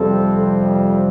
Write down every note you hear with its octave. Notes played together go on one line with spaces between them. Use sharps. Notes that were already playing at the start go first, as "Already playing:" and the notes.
Already playing: F2 C3 G3 C4 A4